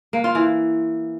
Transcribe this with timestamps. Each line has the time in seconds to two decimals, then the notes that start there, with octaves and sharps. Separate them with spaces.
0.13 A#3
0.24 F4
0.35 E3